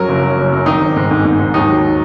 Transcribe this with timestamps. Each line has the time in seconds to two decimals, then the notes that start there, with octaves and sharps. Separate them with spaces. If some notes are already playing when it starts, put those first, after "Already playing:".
Already playing: F#2 F#3 A#4
0.09 F#1
0.23 F#3
0.37 F#1
0.52 F#2
0.66 D#3 D#4
0.81 G#1
0.96 G#2
1.11 G#2
1.25 G#2
1.39 G#2
1.54 D#2 D#4
1.69 F#3